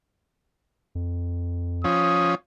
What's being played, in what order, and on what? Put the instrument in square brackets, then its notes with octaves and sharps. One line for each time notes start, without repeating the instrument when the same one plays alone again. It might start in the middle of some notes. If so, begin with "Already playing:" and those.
[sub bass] F2
[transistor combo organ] F3 C#4 [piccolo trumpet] D#6